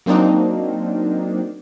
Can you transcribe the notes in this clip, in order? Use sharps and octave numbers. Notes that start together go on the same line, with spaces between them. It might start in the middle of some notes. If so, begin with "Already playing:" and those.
F#3 A#3 C4 D4 D#4